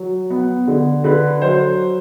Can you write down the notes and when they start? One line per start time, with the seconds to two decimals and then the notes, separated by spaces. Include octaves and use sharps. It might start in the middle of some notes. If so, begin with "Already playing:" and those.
Already playing: F#3
0.30 B3
0.67 D3
1.04 D3 B4
1.41 F#3 C5